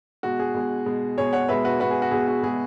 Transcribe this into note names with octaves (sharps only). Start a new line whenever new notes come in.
B2 G#3 F#4
G#4
B2 G#3
B2 G#3
B2 G#3 G#4 C#5
C#5 F#5
B2 G#3 B4 E5
F#4 B4
B2 G#3 F#4 B4
G#4
F#4
B2 G#3 G#4
F#4
B2 G#3 G#4